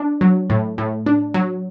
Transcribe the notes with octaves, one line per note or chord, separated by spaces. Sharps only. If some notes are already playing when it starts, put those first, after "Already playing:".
Already playing: D4
F#3
A2
A2
D4
F#3